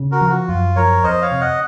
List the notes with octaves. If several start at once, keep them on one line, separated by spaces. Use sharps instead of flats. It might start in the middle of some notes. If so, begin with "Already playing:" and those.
Already playing: C#3
F#4 A#4
F3
F#4
F#2 F4
F3 A#4 C#5
F2 C5 D#5
C#5 F5
C3
D#5 F#5